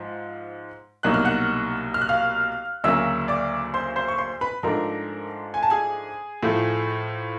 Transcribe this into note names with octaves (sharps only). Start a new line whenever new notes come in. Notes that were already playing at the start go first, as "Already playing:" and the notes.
Already playing: G#2 F3
C2 B2 F#3 A#3 D#4 F#6
F6
F#5 F#6
F6
F#6
F5 F6
D2 C#3 F#3 A#3 E5 E6
D5 D6
C5 C6
C5 C6
C#6
C5 C6
B4 B5
G#2 F3 A3 D4 A#4 A#5
G#5
A5
G#4 G#5
A2 F3 A3